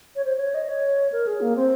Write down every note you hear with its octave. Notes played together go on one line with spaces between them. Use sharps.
C#5
C5
C#5
D#5
C#5
A#4
G#4
A#3
C4